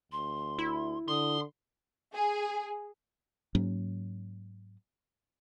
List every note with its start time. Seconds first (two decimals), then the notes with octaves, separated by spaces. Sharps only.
0.12 D2 C6
0.59 E4
1.08 D3 C6 D#6
2.14 G#4
3.55 G#2 F#3 A#3 C#4